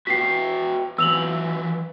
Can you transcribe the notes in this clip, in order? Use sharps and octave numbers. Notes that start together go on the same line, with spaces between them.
F#4 B4 G5 B6 C7
E3 F#3 E6 F7 F#7